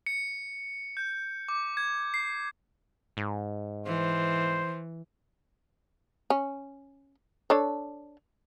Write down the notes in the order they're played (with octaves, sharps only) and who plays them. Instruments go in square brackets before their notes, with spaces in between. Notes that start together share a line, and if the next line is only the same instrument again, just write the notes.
[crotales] C#7
G6
D6
G#6
C7
[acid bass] G#2
[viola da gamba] E3 [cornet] C5
[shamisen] C#4
D4 A4 C#5